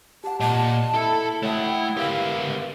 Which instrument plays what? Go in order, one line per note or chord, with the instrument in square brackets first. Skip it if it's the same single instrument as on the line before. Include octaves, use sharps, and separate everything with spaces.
[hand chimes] G4 F#5 [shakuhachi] A5
[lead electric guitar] A#2 [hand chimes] D#5 [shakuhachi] A5
[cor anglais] E4 [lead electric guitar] A4
[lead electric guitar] A3 F#5 [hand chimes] C#5 E5 B5 [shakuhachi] G5
[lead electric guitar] B3 G4 [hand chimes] A#4 [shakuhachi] F5